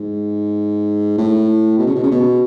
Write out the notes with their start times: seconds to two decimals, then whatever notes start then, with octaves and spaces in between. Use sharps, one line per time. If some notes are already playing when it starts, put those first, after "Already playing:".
Already playing: G#2
1.18 A2
1.78 B2
1.87 C#3
1.95 B2
2.03 C#3
2.11 B2